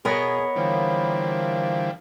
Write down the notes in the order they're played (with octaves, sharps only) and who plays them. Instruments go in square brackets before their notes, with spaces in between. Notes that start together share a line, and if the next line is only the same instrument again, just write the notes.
[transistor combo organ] B2 [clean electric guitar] B3 [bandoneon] G#4 [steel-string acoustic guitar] A#4 C#5 D#5
[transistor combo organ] D3 E3 G3 [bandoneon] F3 A#3